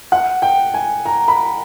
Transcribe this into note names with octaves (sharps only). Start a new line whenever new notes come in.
F#5
G5
G#5
A#5
B5